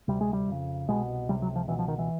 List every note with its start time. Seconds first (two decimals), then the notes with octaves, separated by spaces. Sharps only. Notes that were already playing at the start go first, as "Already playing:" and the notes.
0.08 D2 C3 G3
0.21 G#3
0.33 G3
0.48 F2 C#3
0.88 C2 B2 G#3
1.29 C#2 C3 G3
1.42 F#3
1.56 F3
1.68 C#2 B2 E3
1.79 F3
1.88 D#3
1.99 E3